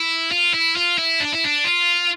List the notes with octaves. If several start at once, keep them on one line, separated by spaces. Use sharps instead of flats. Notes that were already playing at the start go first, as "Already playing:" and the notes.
Already playing: E4
F4
E4
F4
E4
D4
E4
D4
F4